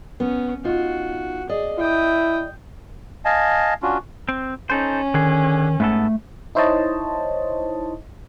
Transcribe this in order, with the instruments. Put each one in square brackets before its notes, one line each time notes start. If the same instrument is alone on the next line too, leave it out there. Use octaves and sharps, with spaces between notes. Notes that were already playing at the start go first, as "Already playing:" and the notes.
[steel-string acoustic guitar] B3 [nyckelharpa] C#4
[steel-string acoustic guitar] D#4 F4 [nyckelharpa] F#4
[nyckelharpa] G#4 [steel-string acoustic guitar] D5 D#5
[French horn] E4 [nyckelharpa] G5 D#6
[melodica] D#5 F5 G#5 A5
C#4 D4 F4 F#4
[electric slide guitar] C4
[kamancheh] C#4 [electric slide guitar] D#4 A4 C5
[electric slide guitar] D3 G#4 [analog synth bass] D#3
[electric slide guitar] G#2 B3 A4 [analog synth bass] A3
[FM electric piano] D#4 E4 C5 C#5 D#5 A5